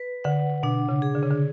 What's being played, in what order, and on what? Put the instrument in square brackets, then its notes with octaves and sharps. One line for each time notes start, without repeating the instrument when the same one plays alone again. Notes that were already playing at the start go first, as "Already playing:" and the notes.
Already playing: [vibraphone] B4
[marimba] D3 [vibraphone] F#5
[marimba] B2 [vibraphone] D4
[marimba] C#3
[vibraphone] G#4
[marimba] D3
C#3
D3